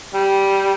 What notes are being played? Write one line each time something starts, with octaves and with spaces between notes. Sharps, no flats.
G3